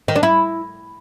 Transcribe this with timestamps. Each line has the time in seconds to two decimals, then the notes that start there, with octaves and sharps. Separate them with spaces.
0.08 D#3
0.16 D4
0.23 E4